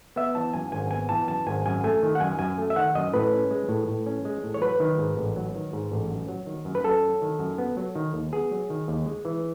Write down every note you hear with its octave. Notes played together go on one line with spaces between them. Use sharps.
B3 E5
E3 A5
F#2 G#5
G#1 G#5
B3 G#5
E3 A5
F#2 A5
G#1 G#5
F#2 G#5
A3 G#5
D#3
F#5
F#2 G#5
F#2 G#5
A3
E5
D#3 F#5
F#2 D#5
A2 B4
C#4
G#3
A2
A2
C#4
G#3
A2
C#5
F#3 B4
D#3
G#2
A1
F#3
D#3
G#2
A1
F#2
F#3
D#3
F#2
B4
F#2 A4
F#3
D#3
F#2
B3
F#3
D#3
D#2
B3 G#4
F#3
D#3
D#2
G#3
E3